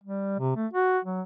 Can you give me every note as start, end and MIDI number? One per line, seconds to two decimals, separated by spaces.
0.03 0.38 55
0.39 0.53 48
0.56 0.67 57
0.73 0.99 66
1.05 1.22 54